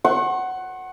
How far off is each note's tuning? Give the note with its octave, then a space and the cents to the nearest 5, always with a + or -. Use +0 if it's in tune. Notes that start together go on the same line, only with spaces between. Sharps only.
F#5 +10 C#6 -45